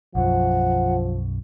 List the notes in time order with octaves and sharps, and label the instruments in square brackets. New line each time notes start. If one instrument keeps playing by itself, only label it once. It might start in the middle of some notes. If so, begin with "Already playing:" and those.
[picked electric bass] B1 F#2 [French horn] F3 [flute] F#5